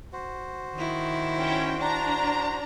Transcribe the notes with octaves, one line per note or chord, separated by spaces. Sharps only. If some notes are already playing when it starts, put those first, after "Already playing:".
F#4 C5
D#3 E4
C#4 G5
D4 A#5